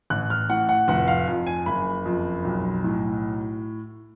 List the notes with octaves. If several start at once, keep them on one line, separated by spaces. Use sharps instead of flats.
A1 F#6
F6
A2 F#5
F#5
F1 F#5
F5
F2
G#5
F#1 B5
F2
B1
A2